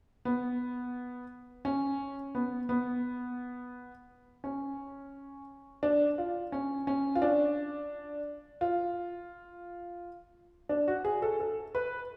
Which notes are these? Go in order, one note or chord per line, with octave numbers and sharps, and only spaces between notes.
B3
C#4
B3
B3
C#4
D4
F4
C#4
C#4
F4
D4
F4
D4
F#4
G#4
A4
A4
B4